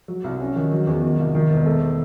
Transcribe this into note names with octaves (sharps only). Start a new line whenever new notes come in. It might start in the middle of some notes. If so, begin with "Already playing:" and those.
F#3
C2
C#4
D#3
F#3
E2
D#3
C2
D#3
E1
A3